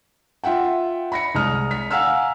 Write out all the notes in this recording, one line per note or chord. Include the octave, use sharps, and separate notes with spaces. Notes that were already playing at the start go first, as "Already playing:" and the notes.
F4 E5 F#5 G5
B5 A#6 C#7
C2 G#3 A#5 D#6 F6
B6
F5 F#5 G#5 A#5 E6 F6